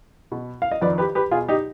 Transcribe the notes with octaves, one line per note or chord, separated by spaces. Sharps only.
B2
F5
D#5
F2 D#3 B4 D5
G4 B4
G4 B4
B2 F4 G#4
D#4 G4